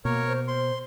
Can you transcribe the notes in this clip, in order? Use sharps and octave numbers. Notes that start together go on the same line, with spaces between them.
B2 A#3 A#4 C#5
C5
C5 C6